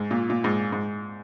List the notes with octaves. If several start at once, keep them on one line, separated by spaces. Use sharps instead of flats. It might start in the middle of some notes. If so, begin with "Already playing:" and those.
Already playing: G#2
A#2
A#2
G#2
G#2